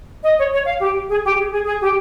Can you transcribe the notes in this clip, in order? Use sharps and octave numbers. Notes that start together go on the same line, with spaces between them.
D#5
C#5
C#5
F5
G4
G#4
G4
G#4
G#4
G#4
G4